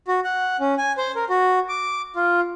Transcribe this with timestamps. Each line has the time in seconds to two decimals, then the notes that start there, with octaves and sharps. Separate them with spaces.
0.08 F#4
0.24 F#5
0.60 C#4
0.78 G#5
0.98 C5
1.16 A#4
1.30 F#4
1.69 D6
2.16 F4